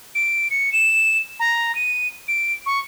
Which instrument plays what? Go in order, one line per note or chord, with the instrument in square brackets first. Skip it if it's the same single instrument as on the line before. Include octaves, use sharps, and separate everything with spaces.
[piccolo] D7
C#7
E7
A#5
D#7
D7
C#6